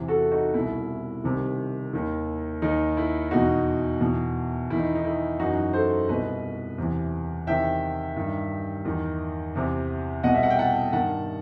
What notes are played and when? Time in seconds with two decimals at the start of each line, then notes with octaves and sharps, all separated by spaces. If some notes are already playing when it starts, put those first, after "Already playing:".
Already playing: E2 C3 E3
0.08 F#4 A4
0.31 D#4 F#4
0.54 C2 B2 E4
1.24 C2 C3 D#3
1.93 D#2 D#3
2.62 D#2 D#3 D#4
2.97 E4
3.31 E2 B2 D#4 F#4
4.00 E2 B2
4.70 E2 D#3 E4
4.78 D#4
4.95 D#4
5.05 E4
5.39 F#2 E3 D#4 F#4
5.73 A4 C5
6.08 C2 B2 B4 D#5
6.78 E2 C3 E3
7.47 E2 C3 D#3 E5 G5
8.16 G2 D#3
8.85 E2 D#3
9.55 E2 C3 E3
10.24 C2 B2 D#5 F#5
10.34 E5
10.43 F#5
10.50 G5
10.59 F#5 A5
10.93 G2 D#3 F#5 A5